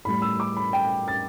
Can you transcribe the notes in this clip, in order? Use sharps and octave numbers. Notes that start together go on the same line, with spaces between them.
A2 G3 B5
E6
D6
B5
G5
A6